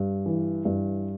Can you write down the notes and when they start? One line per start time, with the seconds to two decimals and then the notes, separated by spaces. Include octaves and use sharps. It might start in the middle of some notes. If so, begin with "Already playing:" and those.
Already playing: G2
0.26 E3
0.65 G2